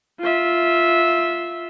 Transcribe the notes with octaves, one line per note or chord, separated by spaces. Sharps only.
F4 E5